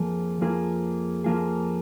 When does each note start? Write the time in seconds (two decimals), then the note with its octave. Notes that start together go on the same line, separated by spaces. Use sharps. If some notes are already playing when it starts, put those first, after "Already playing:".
Already playing: F2 F3 A#3 F4 G#4
0.41 F2 F3 A#3 F4 G#4
1.24 F2 F3 A#3 F4 G#4